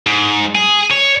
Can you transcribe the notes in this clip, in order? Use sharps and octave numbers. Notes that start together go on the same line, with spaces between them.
G#2
G#4
C#5